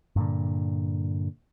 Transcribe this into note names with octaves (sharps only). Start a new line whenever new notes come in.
G2 A#2 D3